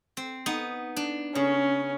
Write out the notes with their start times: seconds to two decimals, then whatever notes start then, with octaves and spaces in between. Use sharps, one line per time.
0.17 C4
0.46 B3 D#4
0.96 D4
1.35 C#3 C#4